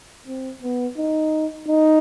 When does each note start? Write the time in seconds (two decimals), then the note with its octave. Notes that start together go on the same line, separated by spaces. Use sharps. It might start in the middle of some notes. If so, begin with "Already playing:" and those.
0.27 C4
0.63 B3
0.98 D#4
1.68 D#4